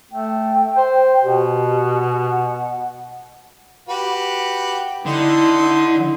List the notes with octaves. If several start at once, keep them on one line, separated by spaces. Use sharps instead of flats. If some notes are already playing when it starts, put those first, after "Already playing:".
A3 G5
C5
B2 G4
F#5
F#4 G4 B4
D3 D#4 E4 C6